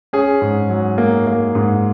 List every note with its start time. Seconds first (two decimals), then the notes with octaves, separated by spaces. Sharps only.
0.13 C#4 G#4
0.41 G#2
0.70 F#3
0.98 A#3
1.27 A#3
1.55 G#2